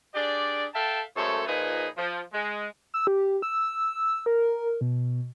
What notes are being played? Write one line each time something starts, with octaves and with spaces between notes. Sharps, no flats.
D4 G4 G#4 D5
A4 E5 F5 G5 A5
F#2 G#3 A3 A4 C5 C#5
A#2 F3 D#4 G#4 B4
F3
G#3
E6
G4
E6
A#4
B2